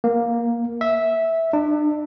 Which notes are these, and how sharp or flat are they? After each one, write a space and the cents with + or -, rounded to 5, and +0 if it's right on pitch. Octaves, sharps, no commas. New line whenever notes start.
A#3 +10
E5 -10
D4 +35